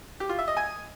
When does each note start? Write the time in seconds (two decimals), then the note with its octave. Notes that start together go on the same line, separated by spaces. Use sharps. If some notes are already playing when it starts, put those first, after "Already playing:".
0.20 G4
0.29 F4
0.38 E5
0.48 D#5
0.57 G#5